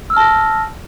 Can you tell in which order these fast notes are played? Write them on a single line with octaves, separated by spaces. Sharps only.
E6 F6 A5 A#6